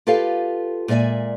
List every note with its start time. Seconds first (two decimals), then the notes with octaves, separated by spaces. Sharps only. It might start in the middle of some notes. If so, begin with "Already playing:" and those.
0.07 F4 G4 A4 B4 F5
0.88 A#2 G#3 D5 E5 G#5